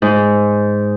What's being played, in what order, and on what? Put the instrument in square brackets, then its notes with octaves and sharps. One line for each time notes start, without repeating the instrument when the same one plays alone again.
[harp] G#2